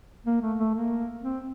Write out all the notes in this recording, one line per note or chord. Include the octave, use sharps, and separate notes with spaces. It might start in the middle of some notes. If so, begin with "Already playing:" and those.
A#3
A3
A3
A#3
C4